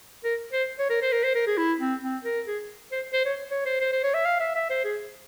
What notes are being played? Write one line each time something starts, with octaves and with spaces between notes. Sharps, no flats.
A#4
C5
C#5
A#4
C5
A#4
C5
A#4
G#4
E4
C4
C4
A#4
G#4
C5
C5
C#5
C#5
C5
C5
C5
C#5
E5
F5
E5
E5
C5
G#4